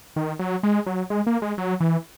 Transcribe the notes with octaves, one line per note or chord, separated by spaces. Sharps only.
D#3
F#3
G#3
F#3
G#3
A#3
G#3
F#3
E3